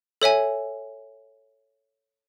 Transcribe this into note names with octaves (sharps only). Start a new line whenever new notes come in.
A4 C#5 E5 G#5